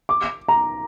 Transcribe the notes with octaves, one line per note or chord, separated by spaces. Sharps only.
D6
A#5